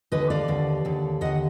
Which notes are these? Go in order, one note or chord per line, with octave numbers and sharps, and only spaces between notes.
D#2 D3 B4 D#5
D5 F5
D#2 D3
D#2 D3
D#2 D3 D#5 F#5